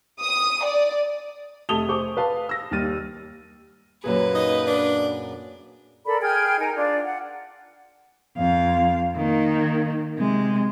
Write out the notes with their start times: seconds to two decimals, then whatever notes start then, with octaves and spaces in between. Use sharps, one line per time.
0.21 D#6
0.63 D5
1.69 F1 A3 A5 D#6 F7 G7
1.88 G#4 C5 C#6 D6
2.17 B4 F5 A5
2.49 E6 A#6
2.71 D#2 G3 F6 A6 D#7
4.04 F#2 A#2 G#4 B4
4.35 D#4
4.67 D4
6.05 A4 A#4 D5 B5
6.21 G#4 G5 F6 G#6
6.59 D#4 A#4 G#5 A#5
6.76 D4 F4 D5
7.03 F#5
8.37 F2 F5
9.17 D#3 A#3
10.18 C3 G#3